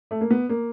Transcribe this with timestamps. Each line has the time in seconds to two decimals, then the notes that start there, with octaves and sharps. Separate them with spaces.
0.11 A3
0.21 A#3
0.30 B3
0.49 A#3